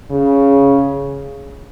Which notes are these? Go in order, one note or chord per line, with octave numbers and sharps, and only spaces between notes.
C#3